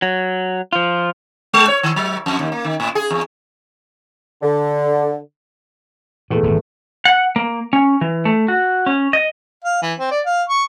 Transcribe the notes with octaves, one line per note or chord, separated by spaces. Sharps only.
F#3
F3 F4
G#3
C#5
D#3
F#3
F2
D#2
A#3
D#3
A2
G#4
E2
D3
E2 A#2 A3
D#1 G#1 A2
F#5
A#3
C#4
E3
A3
F#4
C#4
D#5
F5
E3
C4
D5
F5
C#6